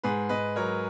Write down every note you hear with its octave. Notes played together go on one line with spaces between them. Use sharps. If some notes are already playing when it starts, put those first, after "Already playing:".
G#2 G#4 B4
G#2 B4 D#5
F#3 A#4 C#5